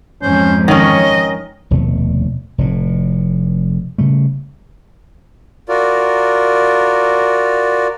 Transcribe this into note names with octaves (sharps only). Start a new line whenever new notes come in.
F2 G#2 C#4 C5
D#3 C#4 C#5 D#5
F1 D#2 B2 A3
F1 A2
C#3 G3 A3
F4 F#4 A#4 D5